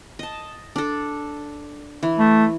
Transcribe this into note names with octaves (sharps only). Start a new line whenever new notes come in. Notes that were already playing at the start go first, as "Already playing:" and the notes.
D#5 A5
D4 A4
E3
A3